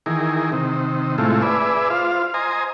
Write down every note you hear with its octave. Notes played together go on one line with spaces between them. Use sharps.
D#3 E3 G#4 A#4
C3 D#3
A2 C3 G#3 A3 E4 F4
G#4 B4 D5 E5
F4 C5 F5
C5 D#5 G#5 A#5